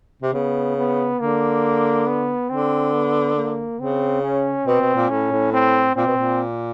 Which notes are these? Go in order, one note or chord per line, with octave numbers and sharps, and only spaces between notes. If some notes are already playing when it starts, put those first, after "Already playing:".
C3
C#3 B3
B3
D3 A#3
B3
D3 C4
B3
A#3
C#3 C4
C#4
B2 C4
B2
A#2
A2 C#4
A2
C4
A#2 C4
B2
A#2